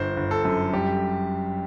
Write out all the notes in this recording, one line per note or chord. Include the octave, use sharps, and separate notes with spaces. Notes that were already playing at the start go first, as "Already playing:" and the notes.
Already playing: G1 C5
G1
A4
F#2
G3 G4